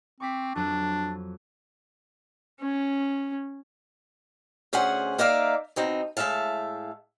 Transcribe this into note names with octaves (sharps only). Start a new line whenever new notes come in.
C4 C#6 D6 B6
F2 F#3 D4 F#6
C#4
D2 C#4 G#4 C5 F#5
A#3 D#4 A#4 D5 E5 F5
B2 C4 D#4
A2 G#3 E5 F5 A5